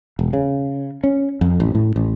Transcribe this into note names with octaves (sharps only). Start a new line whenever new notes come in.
E1
C#3
C#4
F2
A1
A2
A1